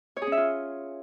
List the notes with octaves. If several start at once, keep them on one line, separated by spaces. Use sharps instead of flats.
C#5
G#4
C#4
E5
F4